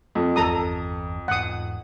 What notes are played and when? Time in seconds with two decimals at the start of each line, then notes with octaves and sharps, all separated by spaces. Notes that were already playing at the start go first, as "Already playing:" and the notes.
0.15 F2
0.36 G1 E2 A4 A#5 D#6
1.28 E1 G#2 F#5 D#6